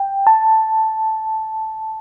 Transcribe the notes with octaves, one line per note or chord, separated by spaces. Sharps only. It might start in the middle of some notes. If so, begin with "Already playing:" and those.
Already playing: G5
A5